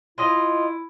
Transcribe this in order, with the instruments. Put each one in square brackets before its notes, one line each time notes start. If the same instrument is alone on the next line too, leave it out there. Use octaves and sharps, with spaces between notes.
[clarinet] E4 [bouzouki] F4 D#5